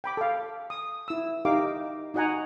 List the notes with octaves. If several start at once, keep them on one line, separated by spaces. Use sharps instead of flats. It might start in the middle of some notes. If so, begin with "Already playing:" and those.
G5 B5 D6
A4 F5
D#6
E4 E6
D#4 G4 A#4 F5 D6
D#4 F#4 D#5 F#5 G#5 A#5